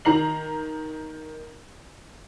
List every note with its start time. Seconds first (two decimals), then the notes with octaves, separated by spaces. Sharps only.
0.05 D#3 A#5 C7 F#7